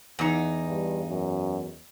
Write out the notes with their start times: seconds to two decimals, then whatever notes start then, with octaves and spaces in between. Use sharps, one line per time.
0.19 E2 D#4
0.67 G2
1.09 F#2